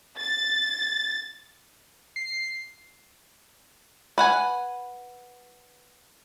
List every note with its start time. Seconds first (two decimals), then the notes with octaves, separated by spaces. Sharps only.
0.18 A6
2.16 C7
4.18 B4 F#5 G#5